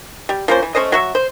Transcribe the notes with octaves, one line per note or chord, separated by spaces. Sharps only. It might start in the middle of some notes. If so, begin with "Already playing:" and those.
G3
F3 A#3 C#4 C5
E3
A3 C#4 C5 D#5
F#3 F#4 E5
C5